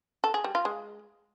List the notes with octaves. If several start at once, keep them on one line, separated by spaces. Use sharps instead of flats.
A4
G#4
G3
F4
G#3